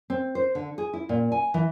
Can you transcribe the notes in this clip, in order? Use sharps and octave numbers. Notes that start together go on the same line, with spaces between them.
C4
C5
D3
G#4
E4
A#2
G#5
E3